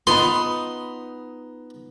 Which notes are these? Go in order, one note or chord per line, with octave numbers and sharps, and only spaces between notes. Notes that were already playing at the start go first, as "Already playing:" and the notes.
B3 D#4 F4 B5 C6